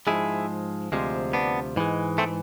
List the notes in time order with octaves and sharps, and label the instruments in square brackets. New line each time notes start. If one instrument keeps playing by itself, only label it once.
[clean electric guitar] G#2 F3 G#3 E4 G#4
D2 C3 F3 G#3
B3 D4
G#2 E3 G#3
A3 C4